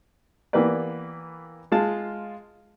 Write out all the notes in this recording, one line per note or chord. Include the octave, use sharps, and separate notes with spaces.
E3 A#3 B3 G4 B4 D5
G#3 F4 A5